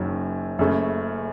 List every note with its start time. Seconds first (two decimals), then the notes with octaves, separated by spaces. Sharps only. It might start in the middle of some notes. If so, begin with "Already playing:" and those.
Already playing: F#1 F#2 D#3 F#3
0.59 F#1 F#2 C#3 A3 C#4